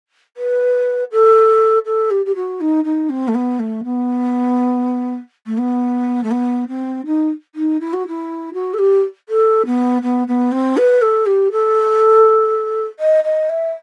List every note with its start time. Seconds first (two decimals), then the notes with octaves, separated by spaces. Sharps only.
0.37 B4
1.12 A4
1.86 A4
2.11 G4
2.26 G4
2.35 F#4
2.61 D#4
2.84 D#4
3.10 C4
3.28 A3
3.35 B3
3.59 A3
3.84 B3
5.46 A3
5.58 B3
6.23 A3
6.31 B3
6.68 C4
7.06 D#4
7.55 D#4
7.81 E4
7.93 F#4
8.08 E4
8.54 F#4
8.74 A4
8.79 G4
9.29 A4
9.66 B3
10.02 B3
10.28 B3
10.52 C4
10.77 B4
11.02 A4
11.26 G4
11.52 A4
12.99 D#5
13.24 D#5
13.49 E5